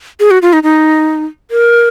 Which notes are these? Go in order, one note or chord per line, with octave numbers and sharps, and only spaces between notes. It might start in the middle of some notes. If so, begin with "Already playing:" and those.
G#4
F#4
F4
D#4
D#4
A#4